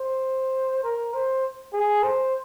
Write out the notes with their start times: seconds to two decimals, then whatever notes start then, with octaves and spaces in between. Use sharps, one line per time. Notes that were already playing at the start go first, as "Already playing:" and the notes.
Already playing: C5
0.84 A#4
1.14 C5
1.73 G#4
2.03 C5